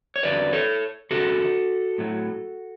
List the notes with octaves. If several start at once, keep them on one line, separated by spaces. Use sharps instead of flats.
C#5
E2 D3 F#3 B4 D5
A4 C#5
E2 C#3 F#3 F#4 A4
A2 F#3